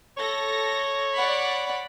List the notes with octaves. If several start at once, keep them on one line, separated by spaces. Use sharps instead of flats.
A4 C#5 A#6
D5 F#5 B5